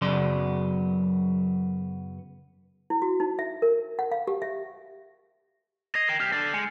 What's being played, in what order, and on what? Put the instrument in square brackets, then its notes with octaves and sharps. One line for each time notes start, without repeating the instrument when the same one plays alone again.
[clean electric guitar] F#2 C#3 F#3 B3 D5 C6
[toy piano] E4
F#4
D#4
E5
A#4
F#5
F5
G4
E5
[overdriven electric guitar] D#5 [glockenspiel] G#6 C7 F7
[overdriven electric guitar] A#4 G5 [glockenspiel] E7
[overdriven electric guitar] B1 G4 [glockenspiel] F6 G6
[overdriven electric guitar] D4 A4
[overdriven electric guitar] G#3 [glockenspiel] G#5 G6 C#7